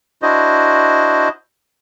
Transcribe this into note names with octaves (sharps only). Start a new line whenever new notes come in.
D4 E4 F#4 C5 D#5